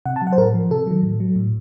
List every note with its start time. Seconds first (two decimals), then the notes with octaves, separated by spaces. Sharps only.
0.06 C3 F#5
0.16 A5
0.22 F#3
0.27 F#5
0.33 C5
0.38 A2 A#4
0.54 F3
0.70 C3 A4
0.87 D#3 F#3
1.03 A2
1.20 F#3
1.36 A2